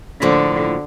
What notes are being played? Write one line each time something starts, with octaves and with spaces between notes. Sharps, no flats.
A2 D3 F3 A#3